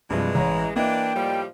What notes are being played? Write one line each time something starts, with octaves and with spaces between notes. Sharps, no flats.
G2 C3 E3 F3 G#3
A1 C#5 A#5
E3 A#3 D4 D#5 G5
A2 F3 G3